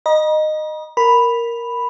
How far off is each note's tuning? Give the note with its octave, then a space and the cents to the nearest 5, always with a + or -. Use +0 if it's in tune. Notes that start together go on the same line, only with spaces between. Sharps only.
D#5 -15 A#5 +45
A#4 +0 B5 +0